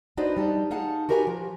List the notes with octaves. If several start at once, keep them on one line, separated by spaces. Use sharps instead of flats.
D4 D#4 F#4 B4 C5 D5
G3 D#4 A5
D#4 G#4 F5 F#5 A5
F#4 G4 A#4 B4 E5 G#5
F3